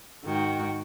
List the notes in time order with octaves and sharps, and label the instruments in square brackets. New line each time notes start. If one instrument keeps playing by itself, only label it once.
[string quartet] G#2 D#3 F#4 G5